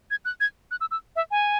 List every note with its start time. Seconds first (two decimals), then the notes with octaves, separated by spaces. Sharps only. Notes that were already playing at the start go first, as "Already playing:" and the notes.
0.11 G#6
0.25 F#6
0.40 G#6
0.71 F#6
0.81 E6
0.91 E6
1.16 E5
1.31 G#5